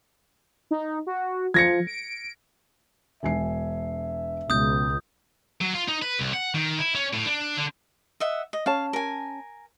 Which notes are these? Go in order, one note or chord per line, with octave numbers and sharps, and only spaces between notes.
D#4
F#4
F3 G#6 A#6 C#7
D7
E1 E5 G#5 C7
C#2 B2 D#6 G6
F#3
F4
D#4
B4
C2
F#5
D#3
E4
C#4
A2
D4
D3
D#5 E5 F#5
D#5
C#4 C#5 F5 A5
A#4 G#5